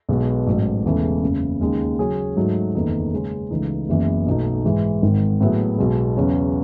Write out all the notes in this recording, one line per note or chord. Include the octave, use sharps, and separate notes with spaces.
B1 B2 G#3 B3
A1 G#2 F#3
E1 E2 C#3 E3 A3
F#1 E2 C#3
D#2 C#3 G#3 D#4
C#3 F#3 C#4 G#4
G#2 F#3 A3 D#4
F#1 E2 D#3 A3 D#4
C#3 G#3 C#4
C#2 C#3 E3 A3 D#4
F#1 F#2 E3 G#3 B3
B1 B2 A3 D#4
G#2 E3 G#3
G#1 G#2 D#3
A2 F#3 B3 E4 G#4
B1 B2 G#3
E2 C#3 F#3 C#4 F#4